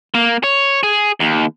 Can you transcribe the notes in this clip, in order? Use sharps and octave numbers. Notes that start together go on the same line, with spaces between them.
A#3
C#5
G#4
D#2